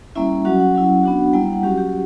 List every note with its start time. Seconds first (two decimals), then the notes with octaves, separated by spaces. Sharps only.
0.16 G3 A#3 C#4 E4 E5
0.45 F#3 C#4 F#4 F#5
0.60 F#5
0.75 F#3 C#4 E4
1.04 B3 D4 F#4
1.33 G3 A#3 E4 G5
1.53 F#5
1.63 F#3 C#4 F#4 G4
1.78 G4